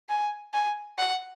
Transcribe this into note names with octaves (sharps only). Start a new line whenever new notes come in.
G#5
G#5
F#5